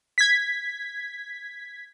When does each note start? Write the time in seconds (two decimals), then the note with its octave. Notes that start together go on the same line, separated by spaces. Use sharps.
0.18 G#6 B6